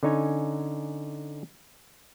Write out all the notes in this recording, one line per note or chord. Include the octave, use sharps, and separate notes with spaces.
D3 C#4 D#4 C#5 G#5